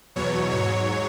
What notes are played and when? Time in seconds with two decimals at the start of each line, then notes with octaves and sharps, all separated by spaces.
0.16 E2 B2 F#3 C#5
0.51 G#2 F#3 C#5